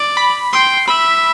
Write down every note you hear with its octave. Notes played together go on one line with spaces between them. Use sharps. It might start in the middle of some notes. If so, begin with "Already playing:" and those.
Already playing: D5
B5
G5 C6
E5 B5